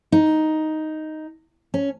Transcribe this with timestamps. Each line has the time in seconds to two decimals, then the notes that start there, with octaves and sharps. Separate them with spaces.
0.12 D#4
1.74 C#4